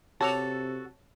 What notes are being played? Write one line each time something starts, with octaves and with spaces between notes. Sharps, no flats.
C3 F#4 A4 C#5 A5 D6 F7